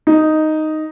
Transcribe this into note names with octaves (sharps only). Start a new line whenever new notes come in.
D#4